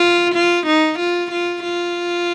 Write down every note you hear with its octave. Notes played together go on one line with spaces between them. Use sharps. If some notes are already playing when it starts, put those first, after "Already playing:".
Already playing: F4
F4
D#4
F4
F4
F4